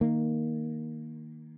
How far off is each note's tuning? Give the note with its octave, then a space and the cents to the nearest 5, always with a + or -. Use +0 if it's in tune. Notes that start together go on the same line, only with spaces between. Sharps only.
D#3 +0 A#3 +0